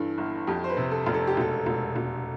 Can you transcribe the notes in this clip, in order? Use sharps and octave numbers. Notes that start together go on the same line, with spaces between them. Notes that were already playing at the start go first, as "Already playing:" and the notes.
Already playing: G2 E3 A4
G1
F2 G4
C5
B4
C3
A4
F1
A4
G4
E1 A4
E1
E1